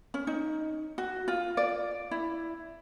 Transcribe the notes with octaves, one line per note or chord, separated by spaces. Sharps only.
C#4
D#4
F#4
F4
D5
E4